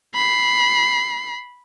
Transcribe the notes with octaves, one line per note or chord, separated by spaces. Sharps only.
B5 C7